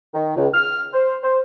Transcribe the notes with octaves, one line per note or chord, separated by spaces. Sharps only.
D#3
C#2
F6
C5
C5